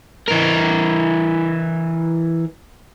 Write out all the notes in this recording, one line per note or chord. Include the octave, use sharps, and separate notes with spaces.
E3 A#4